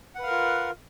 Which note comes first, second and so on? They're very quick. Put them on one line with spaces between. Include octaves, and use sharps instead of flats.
F#5 B4 F5 A#4 F4